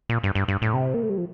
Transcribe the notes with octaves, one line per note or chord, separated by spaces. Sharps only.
A#2
G2
G2
G2
A2
C3
A#3
A3
G3
F3